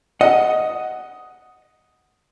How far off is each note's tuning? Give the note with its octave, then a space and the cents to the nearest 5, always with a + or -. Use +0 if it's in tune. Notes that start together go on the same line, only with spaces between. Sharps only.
D#5 +5 F#5 +0